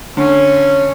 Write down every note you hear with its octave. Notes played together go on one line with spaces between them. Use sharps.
D3 C#4